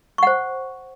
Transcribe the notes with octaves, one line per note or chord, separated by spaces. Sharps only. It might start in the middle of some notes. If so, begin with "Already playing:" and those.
C5 F#5 C#6